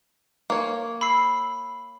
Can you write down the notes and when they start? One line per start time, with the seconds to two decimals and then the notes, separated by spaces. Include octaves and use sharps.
0.50 A#3 C#5
1.01 B5 E6 C7